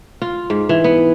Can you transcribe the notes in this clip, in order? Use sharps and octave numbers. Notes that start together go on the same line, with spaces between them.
F4
G#2
E3
B3